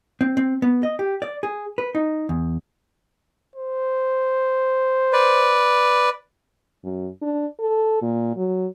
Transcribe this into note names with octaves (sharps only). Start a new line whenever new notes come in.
C4
C4
B3
D#5
G4
D5
G#4
B4
D#4
E2
C5
B4 D5
F#2
D4
A4
A#2
F#3